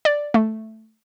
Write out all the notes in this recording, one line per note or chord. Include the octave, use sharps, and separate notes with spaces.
D5
A3